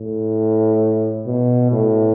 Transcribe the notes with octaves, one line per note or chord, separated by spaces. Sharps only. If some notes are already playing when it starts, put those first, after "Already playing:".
Already playing: A2
B2
A2